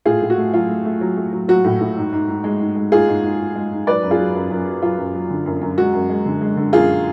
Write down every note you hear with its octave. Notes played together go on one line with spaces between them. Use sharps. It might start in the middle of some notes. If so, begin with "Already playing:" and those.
A2 F4 G#4
A2
F#4
A3
F#3 F4
A3
A3
F#3
A3
F#3
F#3 F#4
A2
A2
G#2
G#2
G#2
G#3
G#2
G#3
G#2 F4 G#4
G#2
G#2
G#2
G#3
G#2
F#3 B4 D5
F#2
F4 G#4
F#3
F#2
F#2
F#3
F#3 F4
F#2
F#3
D3
F#2
F#2
G#3 F#4
F#2
G#3
D3
G#3
D3
F#2 F4 G#4